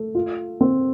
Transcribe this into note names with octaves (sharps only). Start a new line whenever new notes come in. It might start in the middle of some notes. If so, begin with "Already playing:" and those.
Already playing: A3
F4
C4